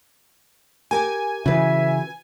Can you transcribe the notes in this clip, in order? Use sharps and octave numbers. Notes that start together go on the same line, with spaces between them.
G4 A#4 G#5
C#3 E3 F#4 B4 E5